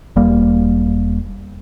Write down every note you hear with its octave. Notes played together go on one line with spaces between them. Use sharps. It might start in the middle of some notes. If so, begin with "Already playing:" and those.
E1 G3 A#3